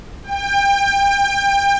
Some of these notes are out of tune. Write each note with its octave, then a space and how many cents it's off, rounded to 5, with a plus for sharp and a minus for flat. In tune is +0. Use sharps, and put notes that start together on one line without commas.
G5 +30